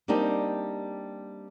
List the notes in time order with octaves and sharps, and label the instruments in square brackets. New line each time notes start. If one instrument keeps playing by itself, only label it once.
[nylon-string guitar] G3 A#3 C4 D4 D#4 G4